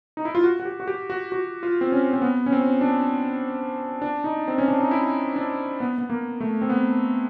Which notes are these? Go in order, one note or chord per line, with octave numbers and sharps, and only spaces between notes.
D#4
E4
F4
F#4
F#4
G4
F#4
G4
F#4
F#4
F4
C4
C#4
C4
B3
C#4
C4
D4
D4
D#4
C4
C#4
D4
D#4
E4
D4
B3
B3
A#3
A3
C4
B3